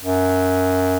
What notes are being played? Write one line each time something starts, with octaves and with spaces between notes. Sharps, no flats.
F#2